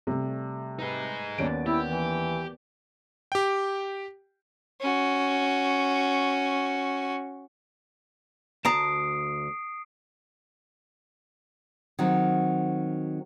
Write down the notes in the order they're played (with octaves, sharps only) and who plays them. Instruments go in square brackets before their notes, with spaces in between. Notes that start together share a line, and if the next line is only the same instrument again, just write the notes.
[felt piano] C3 [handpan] G3 A3
[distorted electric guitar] D#4 G#4 [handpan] B4
[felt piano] D#2 C#4 D7 [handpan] D#3 B3 D5
[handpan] B3 [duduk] E4 [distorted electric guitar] G4
[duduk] E3
[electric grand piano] G4 G5
[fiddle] C#4 F#4
[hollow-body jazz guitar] D2 A5 A#5 [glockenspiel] D#6 C7 D7
[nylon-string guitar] D#3 F#3 C4 F#4